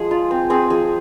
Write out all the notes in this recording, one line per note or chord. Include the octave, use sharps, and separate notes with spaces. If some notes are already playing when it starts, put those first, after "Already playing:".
Already playing: F3 G#3 G#4
F4
C4
C4 G#4
F3 G#4